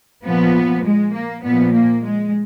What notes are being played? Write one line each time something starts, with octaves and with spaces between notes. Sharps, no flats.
A#2 F3 B3
G#3
A#3
A#2 F3 B3
A#3
G#3